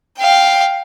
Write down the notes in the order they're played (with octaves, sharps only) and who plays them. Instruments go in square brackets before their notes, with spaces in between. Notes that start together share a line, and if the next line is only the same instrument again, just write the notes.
[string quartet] F5 G5